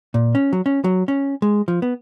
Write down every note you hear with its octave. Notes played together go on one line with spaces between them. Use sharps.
A#2
C#4
F#3
C#4
F#3
C#4
G#3
F3
B3